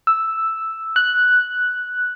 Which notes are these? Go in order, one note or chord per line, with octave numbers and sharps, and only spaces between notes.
E6
F#6